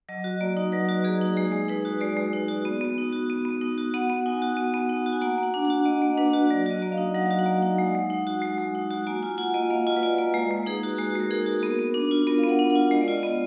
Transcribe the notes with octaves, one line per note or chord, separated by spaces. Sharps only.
F#3 D#5
F#4
A#3 D5
D#4
F#3 B4
F#4
A#3 G#4
D#4
G#3 G#4
G#3
D#4 B4
F#4
G#3 D5
G#3
D#4
F#4
B3
B3
D#4
F#4
B3
B3
D#4
F#4
B3 F#5
B3
D#4 G#5
F#4
B3
B3
D#4
F#4
G#5
A#3 F#5
A#3
F#5
D4
F#5
F#4
A#3 D#5
A#3
D4 B4
F#4
F#3 D5
F#4 D#5
A#3
F5
D#4
F#3 F#5
F#4 F5
F#5
A#3
D#4
G#3
G#3
D#4
F#4
G#3
G#3
D#4
F#4
A#3 G#5
F4 G#5
F4 F#5
A#3 D#5
A#3 F5
F4
B4
F4 D5
A#3
G#3 B4
G#3
D#4 G#4
F#4
G#3 F#4
G#3 A#4
D#4 G#4
F#4
B3 A#4
B3
D4
F4
B3 A#4
F5
B3
F#5
D4
F#5
F4
G#3 D#5
D5
F4 D#5
B3 D5